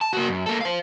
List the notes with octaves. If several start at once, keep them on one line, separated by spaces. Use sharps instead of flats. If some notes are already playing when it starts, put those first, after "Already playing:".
A5
A#3 F#4
F#2
A#3 A4
C5 F5